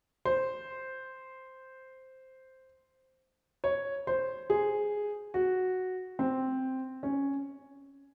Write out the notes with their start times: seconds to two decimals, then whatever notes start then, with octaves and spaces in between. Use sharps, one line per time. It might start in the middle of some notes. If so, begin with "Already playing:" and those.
0.25 C5
3.64 C#5
4.07 C5
4.50 G#4
5.34 F#4
6.19 C4
7.03 C#4